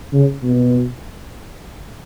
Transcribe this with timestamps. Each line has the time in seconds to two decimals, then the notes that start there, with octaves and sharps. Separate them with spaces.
0.13 C#3
0.43 B2